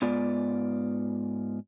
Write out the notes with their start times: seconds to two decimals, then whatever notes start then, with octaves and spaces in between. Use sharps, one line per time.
0.02 G#2 B3 F4 D5